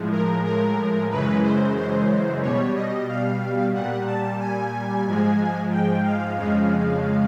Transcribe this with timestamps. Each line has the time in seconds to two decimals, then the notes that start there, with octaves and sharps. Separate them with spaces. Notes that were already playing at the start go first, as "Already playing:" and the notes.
Already playing: A2 F3 G#3
0.12 A#4
0.45 A#4
1.11 F#2 C#3 E3 G#3 B4
1.43 C5
1.77 C5
2.42 B2 G3 C#5
2.75 D#5
3.08 F5
3.73 A#2 G3 F#5
4.06 A5
4.39 G#5
5.06 G#2 F3 G#3
5.71 G5
6.03 F5
6.37 F2 C#3 F3 G#3 F5